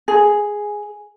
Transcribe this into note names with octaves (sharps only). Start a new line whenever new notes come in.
G#4